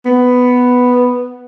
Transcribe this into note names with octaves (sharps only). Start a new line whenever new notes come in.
B3